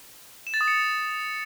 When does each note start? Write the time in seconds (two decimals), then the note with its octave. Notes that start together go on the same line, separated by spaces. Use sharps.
0.47 E7
0.54 A6
0.61 D#6
0.68 C#7